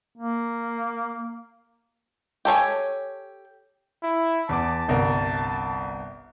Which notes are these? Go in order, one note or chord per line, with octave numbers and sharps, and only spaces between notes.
A#3
G4 A4 C#5 G#5
E4
E2 A5 D6
G1 C2 A#4